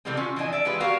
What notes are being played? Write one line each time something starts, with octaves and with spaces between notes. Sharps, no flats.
C3 E3 G3 A3 B3 C4
C#4 F4 F#4
E3 F3 D4 E4 D#5 G#5
D5 E5
E3 G#3 F4 G4 B4
B3 F#4 G4 A#4 F5